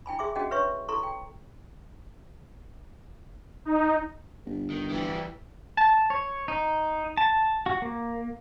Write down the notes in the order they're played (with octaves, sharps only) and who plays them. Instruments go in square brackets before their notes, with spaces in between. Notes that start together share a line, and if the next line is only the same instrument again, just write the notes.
[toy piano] E4 G5 G#5 B5
G#4 E5 C6 D6
C#4 F#4 G#4 D#5 F#5 G5
B4 C#5 E5 C6 C#6
E4 A4 A#5 C6 C#6
G5
[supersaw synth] D#4
[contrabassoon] G1
[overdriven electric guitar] D#3
E3 G3
[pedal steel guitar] A5
C#5
D#4
A5
F#4
A#3